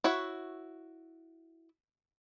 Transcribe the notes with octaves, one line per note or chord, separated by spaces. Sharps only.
E4 F#4 C#5 E5